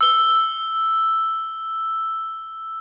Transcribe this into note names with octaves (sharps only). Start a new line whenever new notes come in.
E6 G7